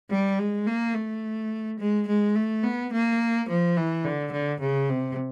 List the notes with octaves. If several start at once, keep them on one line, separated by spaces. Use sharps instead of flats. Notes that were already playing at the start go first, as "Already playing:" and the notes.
G3
G#3
A#3
A3
G#3
G#3
A3
B3
A#3
F3
E3
D3
D3
C#3
C3